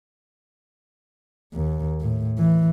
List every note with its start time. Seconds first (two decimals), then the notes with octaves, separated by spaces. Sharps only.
1.54 D#2
2.01 A2
2.39 E3